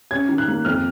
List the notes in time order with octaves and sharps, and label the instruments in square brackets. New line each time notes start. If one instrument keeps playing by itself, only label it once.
[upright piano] C#4 G#6
D#3
F#6
A#3
F2 F6